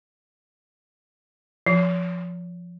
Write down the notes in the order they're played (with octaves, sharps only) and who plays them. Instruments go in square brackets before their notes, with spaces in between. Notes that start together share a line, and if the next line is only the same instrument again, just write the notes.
[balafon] F3